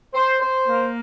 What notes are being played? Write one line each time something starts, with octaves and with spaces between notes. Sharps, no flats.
C5
C5
A#3